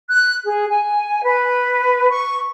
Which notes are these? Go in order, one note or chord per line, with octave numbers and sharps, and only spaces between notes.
F#6
G#4
G#5
B4
C#6